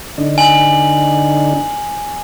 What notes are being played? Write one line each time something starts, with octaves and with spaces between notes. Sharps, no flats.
D3 D4 D#4
G#5 F#7